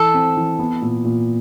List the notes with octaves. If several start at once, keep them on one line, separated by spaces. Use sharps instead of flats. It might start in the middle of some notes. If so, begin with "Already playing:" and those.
Already playing: E3 A4
C4
E3
B3
A#2
A#2